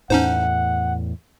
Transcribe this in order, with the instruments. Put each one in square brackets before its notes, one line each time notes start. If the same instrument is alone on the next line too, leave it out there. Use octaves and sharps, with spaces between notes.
[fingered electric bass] E2 A2 [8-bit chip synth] C#4 D#4 C5 [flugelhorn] F#5